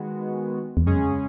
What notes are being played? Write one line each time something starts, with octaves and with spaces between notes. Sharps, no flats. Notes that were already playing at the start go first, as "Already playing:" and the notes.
Already playing: D#3 G#3 B3 F#4
E2
F#2 C#3 G#3 C#4 G#4